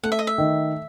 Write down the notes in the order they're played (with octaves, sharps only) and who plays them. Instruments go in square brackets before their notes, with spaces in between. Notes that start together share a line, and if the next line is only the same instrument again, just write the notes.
[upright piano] A3 [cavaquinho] F#5
[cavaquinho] E5
D#5
E5
[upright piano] D#3